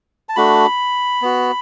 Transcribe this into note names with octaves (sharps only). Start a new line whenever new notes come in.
A5
A3 D4 F#4 B5
B3 F#4